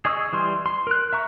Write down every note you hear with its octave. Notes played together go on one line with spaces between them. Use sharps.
G#4 D#5 C#6 D#6 E6
E3 G3 C6
C6
A#4 F#6
E5 A#5 C#6